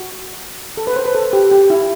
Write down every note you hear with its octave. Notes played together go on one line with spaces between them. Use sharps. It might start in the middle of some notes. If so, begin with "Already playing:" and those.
Already playing: F#4
A4
B4
C5
B4
A4
G4
G4
E4